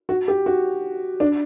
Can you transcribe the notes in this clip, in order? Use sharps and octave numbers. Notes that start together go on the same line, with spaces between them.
F#4
G4
F#4
D4